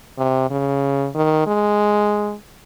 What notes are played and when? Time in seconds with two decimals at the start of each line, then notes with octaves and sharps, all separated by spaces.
0.18 C3
0.50 C#3
1.15 D#3
1.47 G#3